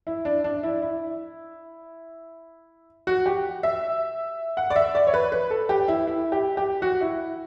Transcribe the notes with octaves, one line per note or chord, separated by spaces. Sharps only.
E4
D4
D4
E4
E4
F#4
G4
E5
F#5
D5
E5
D5
C#5
B4
B4
A4
G4
E4
E4
G4
G4
F#4
E4